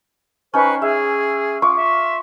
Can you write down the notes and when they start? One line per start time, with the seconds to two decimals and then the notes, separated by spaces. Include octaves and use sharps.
0.54 C#4 D#4 B4 C5 G5 C#6
0.82 G#4 E5
1.62 F4 C#6 D6
1.74 E5